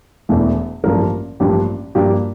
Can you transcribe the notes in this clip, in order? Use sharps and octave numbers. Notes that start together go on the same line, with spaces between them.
E1 E2 E3 A3
A1 G2 F3 A#3 A#4
A1 G2 F3 A#3 D4 G4
G2 F3 A#3 D4 G4